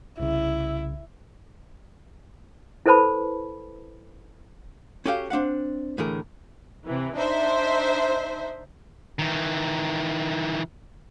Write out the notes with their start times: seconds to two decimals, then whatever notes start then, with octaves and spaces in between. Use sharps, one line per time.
0.20 C2 C#3 E4
2.86 E4 A4 B4 C5 A5 B5
5.06 C#4 F#4 G4 A4 F5 G5
5.30 C4 D4 F5 F#5
5.98 A2 D3 E3 G#4 A#4
6.86 C3 E3
7.17 D4 D#4 C5 E5
9.19 D#3 E3